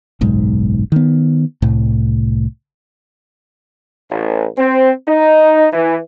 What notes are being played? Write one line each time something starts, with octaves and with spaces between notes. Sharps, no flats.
F#1 B1 G#2
D#3 B3
C2 A2
A1
C4
D#4
E3